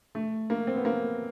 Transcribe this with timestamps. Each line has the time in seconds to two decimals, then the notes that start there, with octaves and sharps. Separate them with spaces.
0.15 A3
0.50 A#3
0.67 C4
0.77 B3
0.85 A#3